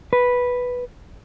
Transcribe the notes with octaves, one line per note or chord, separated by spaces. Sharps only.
B4